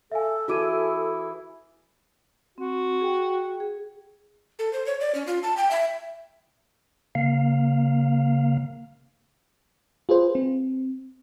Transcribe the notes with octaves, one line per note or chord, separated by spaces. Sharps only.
A4 E5 F5 G#5
E3 E4 F#4 G#4 D6 D#7
C4 F#4
G#4 G5
G#4
A4
C5
C#5
D5
C#4
F4
A5
G5
E5
C#3 A#3 F5
F4 G#4 B4 C5
C4